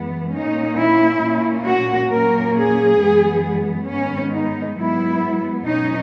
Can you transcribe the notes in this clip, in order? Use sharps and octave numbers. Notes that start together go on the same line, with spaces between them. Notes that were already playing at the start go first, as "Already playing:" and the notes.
Already playing: F#2 E3 G#3 B3
A#2 A#3 C#4 D#4
E4
A#2 A#3 C#4
F#4
A#2 F#3 A#3 C#4 A#4
G#4
F#2 E3 G#3 B3
G#2 D#3 G#3 B3 C#4
D#4
G#2 F#3 B3 E4
B2 F#3 C#4 D#4